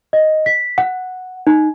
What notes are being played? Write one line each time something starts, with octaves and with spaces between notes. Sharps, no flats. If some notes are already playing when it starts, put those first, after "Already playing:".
D#5
B6
F#5
D#4